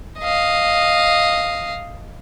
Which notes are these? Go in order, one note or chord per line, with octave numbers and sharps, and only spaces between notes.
D#5 F5